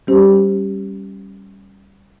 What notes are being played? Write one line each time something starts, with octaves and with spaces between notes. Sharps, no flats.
G3 C#4 G4 C5